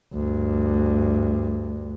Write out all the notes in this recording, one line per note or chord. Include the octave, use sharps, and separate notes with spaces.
D2 G2